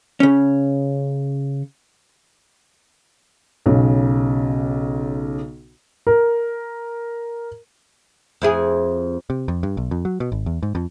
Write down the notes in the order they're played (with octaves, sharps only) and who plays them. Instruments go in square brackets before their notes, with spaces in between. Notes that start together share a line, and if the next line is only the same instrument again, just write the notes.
[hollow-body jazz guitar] C#3 C#4
[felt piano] B1 C#3
[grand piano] A#4
[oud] F2 E4 G#4
[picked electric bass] C3
F2
G2
B1
F2
F#3
B2
G#1
E2
G#2
F2